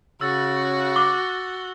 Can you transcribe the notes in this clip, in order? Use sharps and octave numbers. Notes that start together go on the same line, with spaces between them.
C#3 F#4 E6 A6
D6 G7